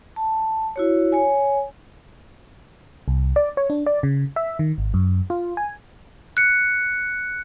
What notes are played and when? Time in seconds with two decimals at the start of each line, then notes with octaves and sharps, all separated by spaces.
0.16 A5
0.76 E4 F#4 C#5
1.12 C#5 G#5
3.08 C2
3.36 D5
3.57 C#5
3.70 D4
3.86 D5
4.03 C#3
4.36 E5
4.59 D#3
4.78 G#1
4.94 F#2
5.30 F4
5.57 G#5
6.37 F#6 C#7